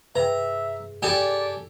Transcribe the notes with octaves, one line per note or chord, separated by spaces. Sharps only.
G2 C3 G#4 B4 E5 G5 A#5
G4 A4 D5 G#5